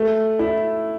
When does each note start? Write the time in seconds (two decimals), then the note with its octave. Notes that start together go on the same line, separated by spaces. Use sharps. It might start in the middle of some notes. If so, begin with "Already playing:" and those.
Already playing: A3
0.39 E4